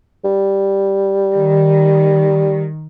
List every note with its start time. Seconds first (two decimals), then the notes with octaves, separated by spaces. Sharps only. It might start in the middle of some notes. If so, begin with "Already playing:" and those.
0.24 G3
1.34 D#3